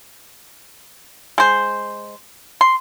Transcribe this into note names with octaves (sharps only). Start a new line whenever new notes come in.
G#3 C5
C6